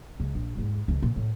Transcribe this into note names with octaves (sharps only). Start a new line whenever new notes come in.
C#2
A#1
E2 G#2
C#2 D#3
A#2
A2